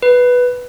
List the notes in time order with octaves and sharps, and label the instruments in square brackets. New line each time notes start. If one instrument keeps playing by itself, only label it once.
[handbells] B4